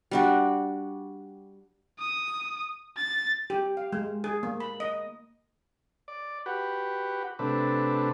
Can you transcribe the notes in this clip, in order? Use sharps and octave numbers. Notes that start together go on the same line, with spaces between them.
G3 D4 F#4
D#6
A6
G4
F5
G#3
G#4
A#3
B5
D#5
D5
F#4 G4 B4
C3 A3 D4 B4